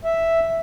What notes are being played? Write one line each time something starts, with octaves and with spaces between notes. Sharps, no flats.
E5